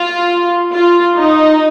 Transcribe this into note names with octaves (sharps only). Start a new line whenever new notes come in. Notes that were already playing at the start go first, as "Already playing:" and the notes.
Already playing: F4
F4
D#4